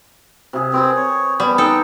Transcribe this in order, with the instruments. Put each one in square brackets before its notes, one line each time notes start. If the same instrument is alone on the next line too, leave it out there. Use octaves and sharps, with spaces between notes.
[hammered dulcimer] C3 G#4
[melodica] C4 [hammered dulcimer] G#4 B4 C5
[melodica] C#5
[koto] G3 [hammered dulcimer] B3
[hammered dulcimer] D#4 A#5 [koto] A4 [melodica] G5